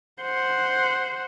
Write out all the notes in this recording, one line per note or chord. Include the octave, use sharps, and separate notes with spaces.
C5 F#5